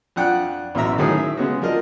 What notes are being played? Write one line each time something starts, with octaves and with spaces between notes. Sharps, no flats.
F2 D4 F#5 G5 F#6
A1 F#2 B2 E5 A#5
A2 D#3 F#3 C#4 G#4
E5
C#3 G#3 B3 C#4 F#4
F3 D4 F#4 A#4 D#5